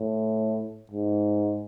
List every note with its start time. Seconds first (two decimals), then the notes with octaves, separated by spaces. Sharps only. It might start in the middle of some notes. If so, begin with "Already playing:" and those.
Already playing: A2
0.91 G#2